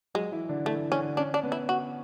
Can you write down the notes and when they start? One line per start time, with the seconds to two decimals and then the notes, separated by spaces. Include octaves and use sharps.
0.15 F#3 G#3 F#4
0.32 E3 E4
0.49 D3 D4
0.66 E3 A3 E4
0.91 D3 C#4 D4
1.17 C#4 D4
1.34 D4
1.43 B3
1.52 E4
1.69 F#4